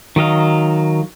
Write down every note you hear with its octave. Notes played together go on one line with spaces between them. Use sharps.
D#3 F#3 D#5 F5